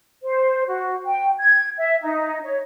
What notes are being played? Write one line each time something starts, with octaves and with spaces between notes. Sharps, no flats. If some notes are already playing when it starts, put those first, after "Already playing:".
C5
F#4
G5
G#6
E5
D#4
C#5